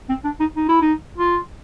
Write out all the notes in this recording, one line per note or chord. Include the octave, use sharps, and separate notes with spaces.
C4
D4
D#4
D#4
E4
D#4
F4